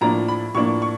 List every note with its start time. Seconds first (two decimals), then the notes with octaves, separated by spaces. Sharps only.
0.01 A2 F3 A#3 D4 A#5
0.28 B5
0.55 A2 F3 A#3 D4 C#6
0.82 C#6